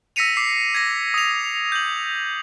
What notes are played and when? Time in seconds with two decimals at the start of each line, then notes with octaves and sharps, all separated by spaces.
0.16 E6 A#6 B6 C#7 D#7 F7
0.37 D6 C7
0.75 G#6 A#6
1.14 D#6 F7
1.72 G6 F#7